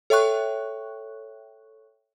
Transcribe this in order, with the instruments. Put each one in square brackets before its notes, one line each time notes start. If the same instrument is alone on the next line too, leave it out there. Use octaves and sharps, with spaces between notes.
[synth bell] A4 C#5 E5 G5 C#6 F#6